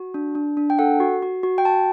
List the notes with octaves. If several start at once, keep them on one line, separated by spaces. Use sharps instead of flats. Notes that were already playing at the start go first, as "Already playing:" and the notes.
Already playing: F#4
D4
D4
D4
G5
A4 F#5
F#4
F#4
F#4
G5
F#4 A5